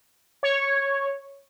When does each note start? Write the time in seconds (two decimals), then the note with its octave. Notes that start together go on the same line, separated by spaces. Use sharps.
0.43 C#5